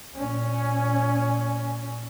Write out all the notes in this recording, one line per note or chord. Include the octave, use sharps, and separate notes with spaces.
A#2 C#4